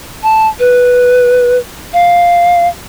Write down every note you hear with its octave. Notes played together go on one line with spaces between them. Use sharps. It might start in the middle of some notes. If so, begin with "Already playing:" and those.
A5
B4
F5